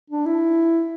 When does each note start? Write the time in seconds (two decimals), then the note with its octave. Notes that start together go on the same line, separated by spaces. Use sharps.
0.10 D4
0.26 E4